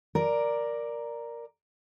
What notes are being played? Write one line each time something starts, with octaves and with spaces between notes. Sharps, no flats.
A#4 D5